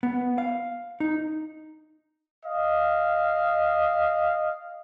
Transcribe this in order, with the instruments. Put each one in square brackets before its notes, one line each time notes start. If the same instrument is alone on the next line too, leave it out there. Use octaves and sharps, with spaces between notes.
[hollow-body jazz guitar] B3
F5
D#4
[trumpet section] D#5 F5